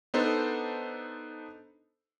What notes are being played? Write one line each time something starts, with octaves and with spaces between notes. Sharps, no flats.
B3 D4 D#4 A4 C5